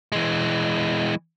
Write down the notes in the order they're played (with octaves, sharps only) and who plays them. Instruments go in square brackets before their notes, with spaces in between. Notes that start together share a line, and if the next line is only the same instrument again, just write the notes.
[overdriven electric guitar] E3 G#3